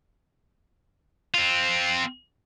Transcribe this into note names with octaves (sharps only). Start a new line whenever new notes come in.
C4 F4